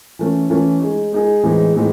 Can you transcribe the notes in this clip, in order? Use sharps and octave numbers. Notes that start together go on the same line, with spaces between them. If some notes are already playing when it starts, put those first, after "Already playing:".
E3 A3 C#4
E3 A3 C#4
G#3 D#4 G#4
G#3 D#4 G#4
A2 E3 G#3 C4 D#4
A2 E3 G#3 C4 D#4